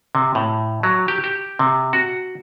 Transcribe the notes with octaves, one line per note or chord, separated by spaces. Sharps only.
C3
A2
F#3
G4
G4
C3
F#4